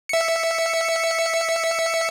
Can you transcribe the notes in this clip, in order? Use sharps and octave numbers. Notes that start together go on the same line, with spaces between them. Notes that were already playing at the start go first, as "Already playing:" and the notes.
E5 C#7